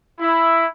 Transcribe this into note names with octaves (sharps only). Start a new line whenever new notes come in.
E4